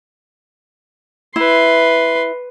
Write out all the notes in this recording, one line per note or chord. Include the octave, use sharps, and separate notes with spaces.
E4 B4 C6